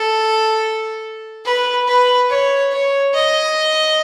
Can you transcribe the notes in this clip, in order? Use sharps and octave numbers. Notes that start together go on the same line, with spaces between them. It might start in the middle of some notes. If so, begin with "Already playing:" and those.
Already playing: A4
B4
B4
C#5
C#5
D#5